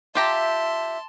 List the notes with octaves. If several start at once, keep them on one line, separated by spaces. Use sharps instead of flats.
F4 G4 E5 A5 A#5 C6